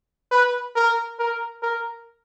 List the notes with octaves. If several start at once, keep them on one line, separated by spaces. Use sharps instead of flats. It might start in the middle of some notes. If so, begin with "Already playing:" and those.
B4
A#4
A#4
A#4